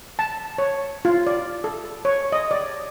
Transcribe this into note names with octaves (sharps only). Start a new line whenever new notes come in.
A5
C#5
F4
D5
A4
C#5
D#5
D5